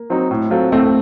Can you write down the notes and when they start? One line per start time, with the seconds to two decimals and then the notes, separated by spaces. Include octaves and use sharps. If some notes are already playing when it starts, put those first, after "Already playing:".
Already playing: A#3
0.10 F#3 C4 D#4
0.31 A2
0.50 F#3 C4 F4 A4
0.72 A2 A3 C4